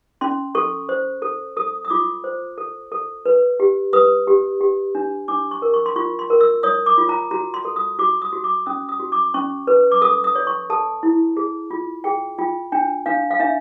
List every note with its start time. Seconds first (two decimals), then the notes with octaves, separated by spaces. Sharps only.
0.21 C#4 C6
0.55 A4 C#6
0.89 C5
1.22 A4
1.57 A4 D#6
1.85 D#6
1.90 F4 D6
2.24 C5
2.58 A4
2.92 A4
3.26 B4
3.60 G4
3.93 B4 D#6
4.27 G4
4.61 G4
4.95 D4
5.28 D4 D6
5.51 C#6
5.62 A#4
5.74 C#6
5.86 C6
5.96 F4 C#6
6.19 C6
6.30 A#4
6.41 E6
6.63 C#5 D#6
6.86 D6
6.98 F4
7.09 A#5
7.31 F#4 A#5
7.54 C6
7.65 A4
7.76 D#6
7.99 F#4 D6
8.22 D#6
8.33 F#4
8.44 D6
8.66 C#4 D#6
8.89 D#6
9.00 F#4
9.12 D6
9.34 C#4 C#6
9.67 B4
9.91 D6
10.02 A4 D#6
10.24 D#6
10.35 C#5
10.47 C#6
10.70 A4 A5
11.03 E4
11.37 G#4
11.71 F4
12.04 G#4 G5
12.38 F4 G5
12.72 D4 G5
13.06 D4 F5
13.30 F5
13.40 D4 E5